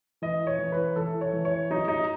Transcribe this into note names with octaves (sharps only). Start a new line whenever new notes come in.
E3 D#5
C#5
E3
B4
E3 A4
C#5
E3
C#5
F#3 D#4
D#4